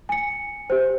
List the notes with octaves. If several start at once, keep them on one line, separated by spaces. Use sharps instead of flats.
G#5 C#7
G4 C5